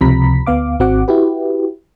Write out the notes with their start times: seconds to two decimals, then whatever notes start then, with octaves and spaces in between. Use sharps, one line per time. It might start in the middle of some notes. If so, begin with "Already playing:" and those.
0.01 C#2 C3 F3 A#5 B5 B6
0.47 D2 B3 F5 D6
0.80 G#1 C4 F#4 F#5 D6
1.08 E4 F#4 G4 B4